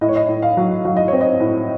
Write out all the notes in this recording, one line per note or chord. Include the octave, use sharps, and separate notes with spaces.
A2 D#5
C#5
D#5
A2
F5
F#3
F#3 F5
D#5
C4 C#5
D#5
A2